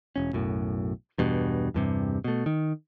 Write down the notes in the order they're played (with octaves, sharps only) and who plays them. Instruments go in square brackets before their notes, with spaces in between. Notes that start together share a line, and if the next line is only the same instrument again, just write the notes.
[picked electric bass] E1 C#4
B1 F#2 A2
E2 G2 B2
E2 G2 C3
B2 A3
D#3